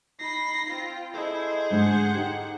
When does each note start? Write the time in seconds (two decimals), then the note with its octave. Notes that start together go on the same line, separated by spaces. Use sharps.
0.19 D#4 B5 A#6 C7
0.67 C4 F4
1.14 E4 G#4 A4 C5 D#5
1.71 G#2 D3 G#3 F#5
2.14 D#4 G4